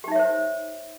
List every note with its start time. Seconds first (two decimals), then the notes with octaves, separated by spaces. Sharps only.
0.04 G4
0.08 D#4
0.12 E5
0.15 C#5
0.19 C5